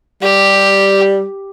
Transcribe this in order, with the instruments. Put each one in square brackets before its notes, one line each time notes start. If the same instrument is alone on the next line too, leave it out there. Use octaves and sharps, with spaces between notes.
[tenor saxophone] G3 [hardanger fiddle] G4